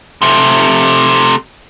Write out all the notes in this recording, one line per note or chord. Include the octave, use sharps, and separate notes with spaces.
C3 A3